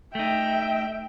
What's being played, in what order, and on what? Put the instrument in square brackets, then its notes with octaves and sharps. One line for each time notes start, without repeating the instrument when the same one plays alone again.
[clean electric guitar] A3 D#4 [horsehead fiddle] E5 [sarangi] G5